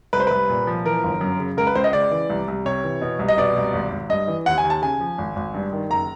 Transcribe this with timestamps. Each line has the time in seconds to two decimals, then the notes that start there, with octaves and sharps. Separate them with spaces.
0.13 C2 B4
0.20 C5
0.27 C2 B4
0.50 A#2
0.67 F3
0.85 E3 A#4
1.03 G1
1.21 F#2
1.39 C#3
1.57 C#2 A#4
1.67 B4
1.75 C#2 C5
1.84 D#5
1.93 C#3 D5
2.11 E3
2.30 C2
2.48 C2
2.65 C3 C#5
2.84 E3
3.01 B2
3.19 C2
3.28 D#5
3.38 B2 D5
3.56 C2
3.73 G#1
3.92 G#1
4.10 G2 D#5
4.28 E3
4.46 D#2 F#5
4.58 G#5
4.64 D#2
4.70 A5
4.82 C#3 G#5
5.00 F3
5.18 G#1
5.36 G#1
5.54 G2
5.73 D#3
5.90 F#1 A#5